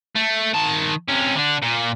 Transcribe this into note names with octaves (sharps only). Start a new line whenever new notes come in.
A3
D#3 A5
C3 C#4
D3 D4
A#2